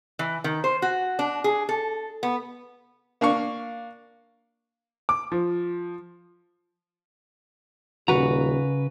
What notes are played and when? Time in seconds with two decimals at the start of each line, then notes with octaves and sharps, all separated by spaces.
0.19 E3
0.44 D#3
0.64 C5
0.82 F#4
1.19 D4
1.44 G#4
1.69 A4
2.23 B3
3.21 A#3 D4 F5 C#6
5.09 D6
5.32 F3
8.08 D#1 C#3 F#4 B4 A#5